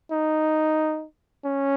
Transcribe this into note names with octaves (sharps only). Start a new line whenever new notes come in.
D#4
C#4